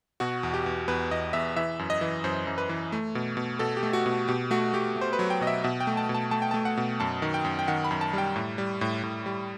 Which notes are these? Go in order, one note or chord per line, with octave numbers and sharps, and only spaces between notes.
B2 F#4
E2
G4
E2
E2 B4
E2 D#5
E2 E5
E3 E5
F#2
D#5
E3
F#2 C5
F#2
B4
E3
A3
B2
B2
B2 A4
G4
A3
F#4
B2
B2 G4
A3 F#4
A3 G4
A3
C5
B4
F#3
G5
B2 D#5
E5
B2 E5
G5
A3
A5
B2
A5
A3 A5
G5
A5
A3
F#5
B2
F#2 A5
D#3
G5
F#2
G5
D#3 F#5
B5
F#2
A5
G3 G5
A2
G3
A2
A2
G3